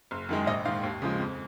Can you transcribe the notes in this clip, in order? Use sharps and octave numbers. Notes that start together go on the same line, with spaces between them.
F#1
F#2 D#3 G#3
A#1 D#5
G#2 D#3 F5
D#2
C#3 F3 G#3
F2